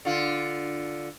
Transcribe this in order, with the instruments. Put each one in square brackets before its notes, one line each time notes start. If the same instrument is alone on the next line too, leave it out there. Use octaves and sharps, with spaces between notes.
[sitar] D3 F4